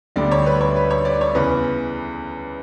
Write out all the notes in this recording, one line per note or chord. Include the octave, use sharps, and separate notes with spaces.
D2 D3 G3 D5
C#5
B4
C#5
B4
C#5
D5
C#5
E2 C#3 E3 B4